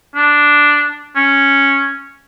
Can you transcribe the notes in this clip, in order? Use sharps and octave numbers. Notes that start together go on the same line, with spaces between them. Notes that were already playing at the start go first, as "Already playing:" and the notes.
D4
C#4